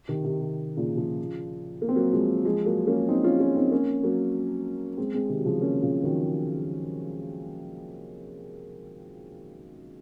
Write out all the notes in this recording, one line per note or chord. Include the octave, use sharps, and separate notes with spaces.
C3 D#3
C3 D#3
C3
A#2 C#3
C#3 F3
A#3
C4
F#3 A#3
F3 G#3
F3 G#3
F#3 A#3
A#3 C#4
C4 D#4
C#4 F4
C#4 F4
C4 D#4
A#3 C#4
F#3 A#3
G#3 C4
G#3 C4
C3 D#3
F#3
C#3 F3
A#3 C#4
C#3 F3
D#3 F#3